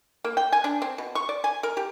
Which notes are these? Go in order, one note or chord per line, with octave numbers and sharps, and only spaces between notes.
A#3
G5
G#5
D4
C4
B2
C#6
D5
G#5
A#4
G4